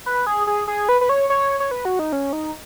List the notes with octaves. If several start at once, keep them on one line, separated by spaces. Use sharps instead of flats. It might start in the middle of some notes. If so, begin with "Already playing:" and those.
B4
G#4
G#4
G#4
B4
B4
C#5
C#5
C#5
B4
F#4
D#4
C#4
D#4